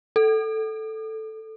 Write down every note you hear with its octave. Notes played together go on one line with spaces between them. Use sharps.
A4